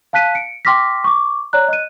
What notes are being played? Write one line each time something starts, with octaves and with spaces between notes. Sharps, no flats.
F5 A5 F#6 B6 D#7
C#7 D7
G5 C6 D6 F6 A#6 B6
C#6 D6
C#5 D5 A#5 F#6
D#5 F#6 D#7